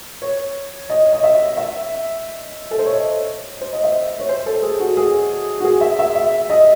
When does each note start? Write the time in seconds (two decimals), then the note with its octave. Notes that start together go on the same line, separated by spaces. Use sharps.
0.22 C#5
0.90 D#5
1.13 D#5
1.23 E5
1.57 E5
2.71 A4
2.78 C5
2.86 C#5
2.93 D#5
3.61 C5
3.73 D#5
3.84 E5
4.20 C#5
4.29 C5
4.46 A4
4.62 G#4
4.80 F#4
4.97 G#4
5.60 F#4
5.64 G#4
5.81 E5
5.99 E5
6.15 E5
6.50 D#5